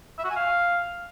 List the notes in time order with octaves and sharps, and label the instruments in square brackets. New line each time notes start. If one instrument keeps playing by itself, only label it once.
[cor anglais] E5
F#4
G#5
F5